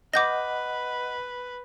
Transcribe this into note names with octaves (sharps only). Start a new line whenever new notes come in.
B4 D#5 F#5 D6 G6 A#6